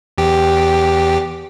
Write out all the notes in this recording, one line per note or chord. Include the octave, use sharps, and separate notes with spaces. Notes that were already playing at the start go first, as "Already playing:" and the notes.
E2 G4